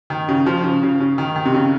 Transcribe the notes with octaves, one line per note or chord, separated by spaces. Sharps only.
D#3
C#3
F3
C#3
C#3
C#3
D#3
D#3
C3
C#3